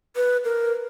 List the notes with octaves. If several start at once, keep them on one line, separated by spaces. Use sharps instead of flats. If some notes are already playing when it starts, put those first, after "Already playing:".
B4
A#4